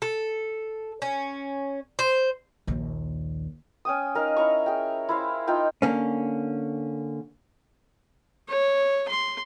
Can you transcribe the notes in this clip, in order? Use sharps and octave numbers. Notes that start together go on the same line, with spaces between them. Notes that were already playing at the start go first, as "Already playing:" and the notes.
A4
C#4
C5
A#1 D#2
C#4 G5 D#6
D#4 A#4 F5
E4 C#5 A#5 C#6
G#4 G5
E4 C5 F5
D#4 F4 G5
D3 A#3 C#4
C#5
C6